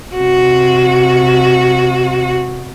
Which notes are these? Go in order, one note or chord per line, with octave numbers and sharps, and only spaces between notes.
C3 F#4